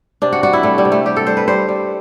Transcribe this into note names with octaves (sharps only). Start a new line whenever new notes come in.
C3 D4
F#4
G3 F#4
E4
G3 A3
G3
C3
A3
G3 G4
A4
G3 C5
B4
G3 C5
G3